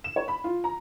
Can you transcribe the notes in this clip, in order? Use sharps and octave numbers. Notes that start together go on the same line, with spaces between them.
E7
C#5
B5
F4
A#5